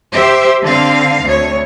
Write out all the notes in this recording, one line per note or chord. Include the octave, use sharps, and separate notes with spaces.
G4 C5 E5
D3 C4 F5
D2 C#5